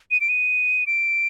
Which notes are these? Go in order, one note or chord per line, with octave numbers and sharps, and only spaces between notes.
D#7
D7
D#7
D7